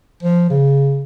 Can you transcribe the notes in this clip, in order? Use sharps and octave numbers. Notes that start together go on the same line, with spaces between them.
F3
C#3